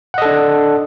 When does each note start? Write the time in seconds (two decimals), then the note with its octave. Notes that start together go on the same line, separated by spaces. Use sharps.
0.14 F#5
0.18 D#5
0.22 A4
0.26 D4